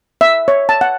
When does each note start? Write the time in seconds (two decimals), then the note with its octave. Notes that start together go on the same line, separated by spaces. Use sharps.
0.21 E5
0.48 C#5
0.69 A5
0.81 F#5